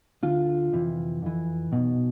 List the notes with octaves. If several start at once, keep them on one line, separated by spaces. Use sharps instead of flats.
D2 D3 F4
F2 C3 E3
F2 E3
B1 B2